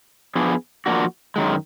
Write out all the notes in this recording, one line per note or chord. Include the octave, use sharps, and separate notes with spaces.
F3 B3 D4 G#4
F3 A#3 D4 F#4
F#2 D#3 G#3